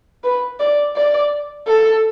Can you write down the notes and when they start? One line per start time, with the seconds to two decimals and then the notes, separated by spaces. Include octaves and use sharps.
0.24 B4
0.60 D5
0.96 D5
1.68 A4